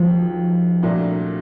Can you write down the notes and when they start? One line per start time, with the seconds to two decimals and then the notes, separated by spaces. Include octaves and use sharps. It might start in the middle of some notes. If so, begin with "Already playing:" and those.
Already playing: E1 D#2 D#3 F3
0.82 C2 A#2 F#3 A3 D4